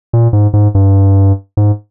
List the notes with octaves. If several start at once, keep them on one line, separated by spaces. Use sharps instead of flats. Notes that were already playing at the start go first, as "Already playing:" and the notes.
A#2
G#2
G#2
G2
G#2